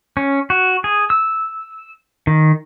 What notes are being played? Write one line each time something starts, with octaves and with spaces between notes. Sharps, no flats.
C#4
F#4
G#4
E6
D#3